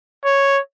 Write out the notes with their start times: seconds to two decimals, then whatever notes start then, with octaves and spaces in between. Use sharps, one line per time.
0.25 C#5